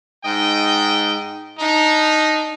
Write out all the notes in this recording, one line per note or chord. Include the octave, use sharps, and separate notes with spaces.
G#2 D#5 G5
D4 D#4